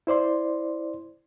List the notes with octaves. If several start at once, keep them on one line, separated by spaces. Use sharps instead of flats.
E4 C5 D5 C6